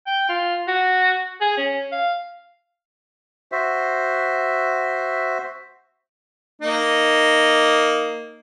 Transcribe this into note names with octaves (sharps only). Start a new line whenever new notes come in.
G5
F4
F#4
G#4
C#4
F5
F#4 C5 E5
A#3 D#4